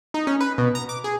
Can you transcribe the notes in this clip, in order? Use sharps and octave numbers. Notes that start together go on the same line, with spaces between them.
D#4
C#4
B4
B2
A#5
D6
G#4